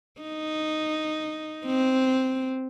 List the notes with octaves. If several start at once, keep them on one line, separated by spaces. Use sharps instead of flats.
D#4
C4